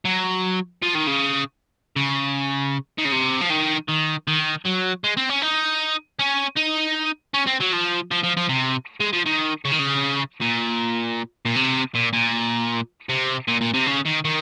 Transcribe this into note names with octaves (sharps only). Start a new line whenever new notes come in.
F#3
F3
D#3
C#3
C#3
D#3
C#3
C3
F3
D#3
D#3
D#3
F#3
G#3
C4
C#4
D#4
C#4
D#4
C#4
C4
F#3
F3
F3
F3
F3
C3
G#3
F3
D#3
C#3
D#3
C#3
A#2
A#2
C3
A#2
A#2
C3
A#2
A#2
C3
C#3
D#3
D#3